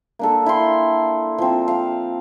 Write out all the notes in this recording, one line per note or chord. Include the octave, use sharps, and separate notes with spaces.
A#3 D4 A4
E4 G5 C6
F3 C4
F5